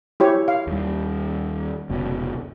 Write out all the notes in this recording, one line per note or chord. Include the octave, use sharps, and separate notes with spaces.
E4 G4 C#5
F5
D#2 G3
F1 C#2 B2